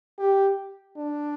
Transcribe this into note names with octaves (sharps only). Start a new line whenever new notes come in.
G4
D4